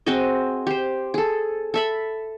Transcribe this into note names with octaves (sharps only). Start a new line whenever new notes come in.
C4 F#4 G#4 D#5
G4 C5
G#4 A4
A4 E5 B5